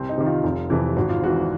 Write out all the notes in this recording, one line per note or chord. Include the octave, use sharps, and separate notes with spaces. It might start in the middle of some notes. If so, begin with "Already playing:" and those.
Already playing: C2 C4
D#4
C3 D#3
F4
F1
F2 C3 E3
G#1 F#4
F4
G#2 E3 F#4